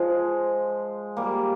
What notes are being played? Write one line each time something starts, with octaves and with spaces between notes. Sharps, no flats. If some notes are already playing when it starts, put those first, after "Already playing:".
Already playing: F3 G#3
G3 A#3